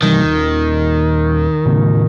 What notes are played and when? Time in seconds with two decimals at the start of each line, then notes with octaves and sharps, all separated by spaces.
0.02 C3 D#3 E3 G3
0.22 D#1
1.65 A2 C#3